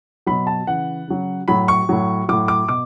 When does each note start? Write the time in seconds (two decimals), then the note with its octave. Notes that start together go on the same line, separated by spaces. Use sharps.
0.26 B2 F#3 B5
0.47 A5
0.67 C#3 E3 F#5
1.08 C#3 F#3
1.48 A2 F#3 B5
1.68 C#6
1.89 A2 F#3
2.28 A2 F#3 D6
2.48 D6
2.68 B2 D6